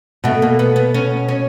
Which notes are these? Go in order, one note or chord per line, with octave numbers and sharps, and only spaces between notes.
B2 A3
A#3
B3
B3
C#4
C#4